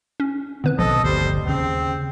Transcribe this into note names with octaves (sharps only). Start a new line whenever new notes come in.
C#4
D3 D#3 B3 C4 B4 F#6
A#1 B2 F3 A4 D#5
G1 D2 G3 C5
D#2 C#3 C4